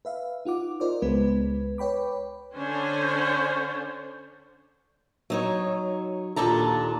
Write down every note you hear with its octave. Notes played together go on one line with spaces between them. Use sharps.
B4 E5 F5
D#4 F4 F#5 D6
F4 A#4 C5 D5 D#5 D6
C#2 G#3 B3 B4
B4 C#5 G5 B5 D6
D3 C#4 D4 C5 C#5
F#3 D#4 C#5
D#2 A#2 D4 A4 A#5